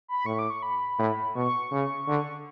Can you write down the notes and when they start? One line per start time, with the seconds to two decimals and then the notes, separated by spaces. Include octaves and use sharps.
0.08 B5
0.25 A2 C#6
0.39 D6
0.50 C#6
0.62 B5
0.99 A2
1.35 B2 C#6
1.72 C#3
2.08 D3